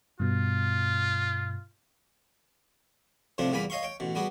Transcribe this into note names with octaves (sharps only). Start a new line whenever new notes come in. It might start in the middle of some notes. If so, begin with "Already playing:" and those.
G2 B2 F4
F2 A2 C3 F3 D4
E2 A#2 G3 G#5 B5
C#5 D#5 F5 C6 C#6
C#5 G5
A1 B2
G3 B3 F#4 G#4